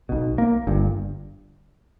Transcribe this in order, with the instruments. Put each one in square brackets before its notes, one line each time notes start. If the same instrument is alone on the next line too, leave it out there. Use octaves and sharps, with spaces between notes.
[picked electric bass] B1 B2
A#3
G1 G2